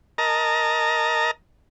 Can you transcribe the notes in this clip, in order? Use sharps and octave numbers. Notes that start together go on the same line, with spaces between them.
A#4 D#5 A5 A#5